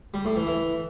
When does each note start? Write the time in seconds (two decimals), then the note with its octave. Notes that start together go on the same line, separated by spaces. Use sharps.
0.14 G3
0.25 A2
0.36 E3
0.47 E3